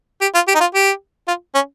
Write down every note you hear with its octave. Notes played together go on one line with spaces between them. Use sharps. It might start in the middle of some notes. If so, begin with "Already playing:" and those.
G4
F4
G4
D#4
F4
G4
F4
C#4